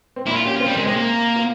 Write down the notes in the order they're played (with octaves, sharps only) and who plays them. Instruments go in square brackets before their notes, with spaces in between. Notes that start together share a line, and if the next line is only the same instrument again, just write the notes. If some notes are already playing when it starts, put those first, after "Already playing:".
[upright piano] C4
[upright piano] A#2 A#3 [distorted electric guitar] E4
[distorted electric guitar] F4
[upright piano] C#4 [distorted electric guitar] G4
[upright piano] C4 [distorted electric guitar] F4
[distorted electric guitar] G3
[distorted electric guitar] G#3 [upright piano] A#3
[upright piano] C3 C4 [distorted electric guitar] G#3
[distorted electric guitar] A#3
[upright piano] F4